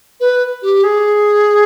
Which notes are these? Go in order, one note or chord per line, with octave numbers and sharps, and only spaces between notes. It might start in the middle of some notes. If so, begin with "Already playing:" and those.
B4
G4
G#4